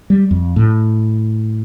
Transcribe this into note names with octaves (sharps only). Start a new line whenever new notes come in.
G3
F2
A2